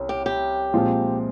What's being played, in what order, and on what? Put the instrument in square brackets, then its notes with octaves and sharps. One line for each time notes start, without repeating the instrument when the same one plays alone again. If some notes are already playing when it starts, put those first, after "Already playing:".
Already playing: [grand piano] C2 C#4
[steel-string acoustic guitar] G4
G4
[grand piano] A#2 F3 G#3 C4 F4